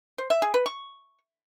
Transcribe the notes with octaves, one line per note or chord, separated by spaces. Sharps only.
C5
E5
G#4
B4
C#6